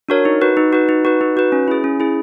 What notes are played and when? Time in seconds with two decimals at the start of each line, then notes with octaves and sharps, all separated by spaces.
0.09 D4 F#4 A#4 C#5
0.25 D#4
0.41 F#4 B4
0.57 D#4
0.73 F#4 B4
0.89 D#4
1.05 F#4 B4
1.21 D#4
1.37 F#4 B4
1.52 C#4
1.68 E4 G#4
1.84 C#4
2.00 E4 G#4